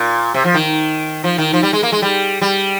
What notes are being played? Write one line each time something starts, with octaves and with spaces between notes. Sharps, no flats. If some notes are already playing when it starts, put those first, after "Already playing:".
Already playing: A#2
C3
F3
D#3
F3
D#3
F3
G3
G#3
A#3
G#3
G3
G3